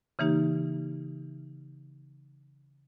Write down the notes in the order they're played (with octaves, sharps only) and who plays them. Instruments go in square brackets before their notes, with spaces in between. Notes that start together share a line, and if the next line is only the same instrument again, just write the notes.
[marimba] C#3 E3 A#3 D#4 G4